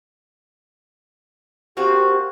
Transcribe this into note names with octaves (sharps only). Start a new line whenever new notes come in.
A#3 C4 F#4 G4